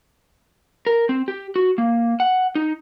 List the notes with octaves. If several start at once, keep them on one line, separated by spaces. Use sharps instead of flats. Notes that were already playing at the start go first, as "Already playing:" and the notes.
A#4
C4
G4
F#4
A#3
F#5
D#4